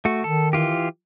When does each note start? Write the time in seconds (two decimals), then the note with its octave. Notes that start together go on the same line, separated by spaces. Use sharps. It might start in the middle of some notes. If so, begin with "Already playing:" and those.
0.05 A3 F#4
0.24 D#3 A4
0.53 E3 F4 G4